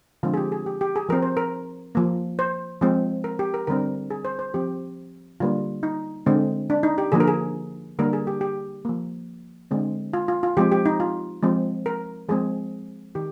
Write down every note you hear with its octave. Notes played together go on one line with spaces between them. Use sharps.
D3 F3 G#3 C4 F4
G#4
G4
G#4
G4
G4
G#4
F3 C4 A#4
C5
A#4
F3 A#3
C5
F3 G#3 C4
A#4
G4
A#4
D3 G3 C4 A#4
G#4
C5
C5
F3 C4 G4
D3 G3 A#3 F4
D#4
D3 G#3 C4
D4
D#4
G4
D3 F3 A#3 G#4
A#4
G#4
D3 G3 A#3 A#4
G#4
G4
G4
F3 A#3
D3 G#3 C4
F4
F4
F4
F3 G#3 C4 G4
G4
D#4
F4
F3 G#3 C4
A#4
F3 G#3 C4 G#4
D#3 G4